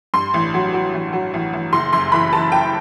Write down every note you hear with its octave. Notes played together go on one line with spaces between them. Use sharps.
G2 C6
A1
F#3
F#3
A1
F#3
A1
A1
F#1 C6
F#2 C6
E3 B5
E3 A5
E3 G5